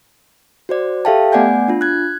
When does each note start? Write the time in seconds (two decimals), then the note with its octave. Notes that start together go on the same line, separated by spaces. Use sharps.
0.69 F#4 C5 D5
1.05 G4 A4 E5 F5 G5 A5
1.32 A3 B3 D5 F#5 G#5 G6
1.68 D4 F4
1.81 F#6 G#6